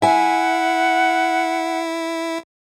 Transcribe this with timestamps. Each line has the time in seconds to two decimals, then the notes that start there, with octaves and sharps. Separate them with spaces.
0.02 E4 E5 F#5 G#5